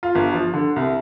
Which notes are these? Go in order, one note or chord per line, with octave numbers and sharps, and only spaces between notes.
F4
G1
F3
D3
C2